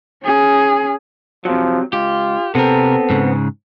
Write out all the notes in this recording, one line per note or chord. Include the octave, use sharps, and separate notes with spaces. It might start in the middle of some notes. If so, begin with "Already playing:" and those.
C#4 G#4
C3 F3 F#3
C#2 F4 G4
C3 B3 C4 A4 A#4
G#2 C#3